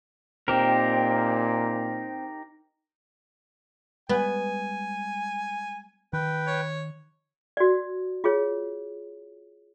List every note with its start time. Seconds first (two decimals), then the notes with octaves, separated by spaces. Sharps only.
0.48 A#2 C4 D#4 G4 A#4
4.09 G3 G#3 B3 G#5
6.13 D#3 B4 G5
6.48 C#5
7.57 F#4 D5
8.24 F4 G#4 C#5